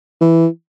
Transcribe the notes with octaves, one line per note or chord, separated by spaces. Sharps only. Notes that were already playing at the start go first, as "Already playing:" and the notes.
E3